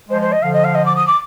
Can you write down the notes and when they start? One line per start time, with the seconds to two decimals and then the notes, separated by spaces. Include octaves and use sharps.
0.09 F3 G#3 C5
0.21 C5
0.32 D#5
0.42 D3 F3 F5
0.53 D#5
0.64 F5
0.74 D#5
0.85 D6
0.96 D#6
1.06 D6